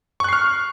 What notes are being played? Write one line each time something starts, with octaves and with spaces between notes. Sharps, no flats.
C#6 F6 F#6 C7